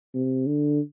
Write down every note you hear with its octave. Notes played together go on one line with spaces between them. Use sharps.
C3
D3